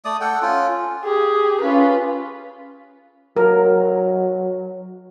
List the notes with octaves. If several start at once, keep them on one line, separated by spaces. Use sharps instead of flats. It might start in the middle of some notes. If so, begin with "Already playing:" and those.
A3 D5 D#6
A4 F#5 G5
C#4 F4
G4 G#4
C#4 F4 B4
F#3 A#4